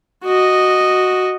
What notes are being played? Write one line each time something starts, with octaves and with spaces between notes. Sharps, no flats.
F#4 D#5